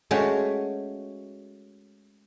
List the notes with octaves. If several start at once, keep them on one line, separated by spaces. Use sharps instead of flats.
G#3 A3 C#4 F#4 C#5 G5